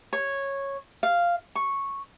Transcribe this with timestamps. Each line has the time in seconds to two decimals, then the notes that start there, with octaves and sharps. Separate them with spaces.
0.13 C#5
1.03 F5
1.55 C#6